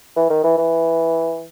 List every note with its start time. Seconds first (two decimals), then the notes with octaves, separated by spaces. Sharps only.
0.16 E3
0.30 D#3
0.44 E3
0.58 E3